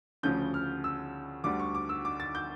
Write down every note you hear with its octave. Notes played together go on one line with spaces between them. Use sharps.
D2 C#3 F3 C#4 G6
F6
E6
D2 D3 G3 D6
C#6
D6
E6
D6
A6
G6